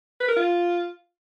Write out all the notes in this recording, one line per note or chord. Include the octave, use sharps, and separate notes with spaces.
B4
A#4
F4